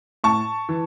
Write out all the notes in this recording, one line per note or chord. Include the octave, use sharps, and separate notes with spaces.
A2 A5 C#6
E3